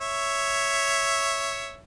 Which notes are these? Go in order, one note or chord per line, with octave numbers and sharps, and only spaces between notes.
C#5 E5